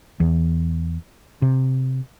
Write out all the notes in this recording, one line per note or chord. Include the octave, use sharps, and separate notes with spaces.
E2
C3